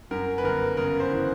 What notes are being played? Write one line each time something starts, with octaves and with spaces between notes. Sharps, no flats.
F#2 A#4
B4
G1 A#4
C#3 A#4
C5
E3